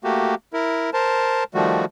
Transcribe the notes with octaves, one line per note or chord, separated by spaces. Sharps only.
A3 A#3 F#4 G4
E4 A#4
A#4 C5 A5
D#3 F3 G3 A3 F#4